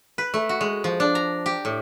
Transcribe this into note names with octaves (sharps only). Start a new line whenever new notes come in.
B4
A3
F#4
G#3
F3
D4
A#5
G4
A2